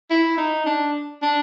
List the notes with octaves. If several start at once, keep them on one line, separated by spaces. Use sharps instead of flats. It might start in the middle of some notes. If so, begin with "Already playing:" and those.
E4
D#4
D4
D4